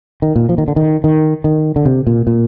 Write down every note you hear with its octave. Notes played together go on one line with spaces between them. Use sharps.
D#3
A#2
F3
D#3
D3
D#3
D#3
D#3
D3
C3
A#2
A#2